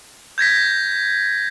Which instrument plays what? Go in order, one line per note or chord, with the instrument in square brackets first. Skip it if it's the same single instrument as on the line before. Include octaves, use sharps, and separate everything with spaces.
[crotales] G6 G#6 A#6 B6